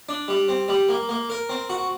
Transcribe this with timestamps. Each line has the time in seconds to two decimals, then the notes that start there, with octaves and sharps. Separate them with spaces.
0.09 D4
0.28 G3
0.49 C4
0.68 G3
0.89 A#3
1.09 A#3
1.30 A#4
1.49 C4
1.70 F#4